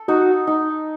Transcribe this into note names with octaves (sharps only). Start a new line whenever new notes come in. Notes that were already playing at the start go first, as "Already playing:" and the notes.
Already playing: A4
D#4 F#4
D#4